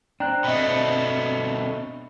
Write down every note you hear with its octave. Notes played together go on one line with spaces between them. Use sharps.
C4 D4 G5 A#5 F#6
B2 A3 D#5 B5